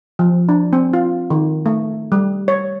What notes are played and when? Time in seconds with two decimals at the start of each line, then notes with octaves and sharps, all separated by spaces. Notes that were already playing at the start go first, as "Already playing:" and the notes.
0.19 F3
0.49 D4
0.73 C4
0.93 F4
1.30 D#3
1.66 A3
2.12 G3
2.48 C#5